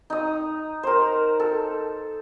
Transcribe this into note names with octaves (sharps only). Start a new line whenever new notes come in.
D#4 D#6
A#4 C5
A4